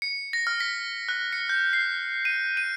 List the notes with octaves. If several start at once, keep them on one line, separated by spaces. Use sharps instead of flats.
C#7
A#6
F6
B6
F#6
C#7
G6
C7
D#7
D#7